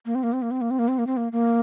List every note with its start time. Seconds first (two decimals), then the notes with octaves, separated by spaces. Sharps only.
0.06 A#3
0.15 C4
0.23 A#3
0.33 C4
0.42 A#3
0.51 C4
0.61 A#3
0.71 C4
0.79 A#3
0.88 C4
0.98 A#3
1.07 C4
1.17 A#3
1.32 A#3